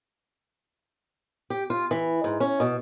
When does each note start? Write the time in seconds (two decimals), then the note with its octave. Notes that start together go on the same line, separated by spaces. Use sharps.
1.50 G4
1.70 F4
1.91 E3
2.24 G#2
2.40 C#4
2.60 B2